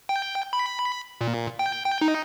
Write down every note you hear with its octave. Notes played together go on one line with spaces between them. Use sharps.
G5
B5
A#2
G5
G5
D#4